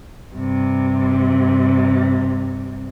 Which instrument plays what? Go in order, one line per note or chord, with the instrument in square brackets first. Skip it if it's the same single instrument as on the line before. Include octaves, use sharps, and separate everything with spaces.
[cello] G2 C3